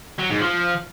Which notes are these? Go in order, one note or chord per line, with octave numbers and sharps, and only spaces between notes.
F#3
G#2
F3